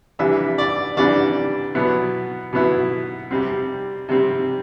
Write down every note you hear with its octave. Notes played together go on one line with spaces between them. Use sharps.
C3 E3 G3 D4 E5
D5
C3 E3 G3 D4 D5
B2 F#3 B3 E4
B2 F#3 B3 E4
C3 G3 C4
C3 G3 C4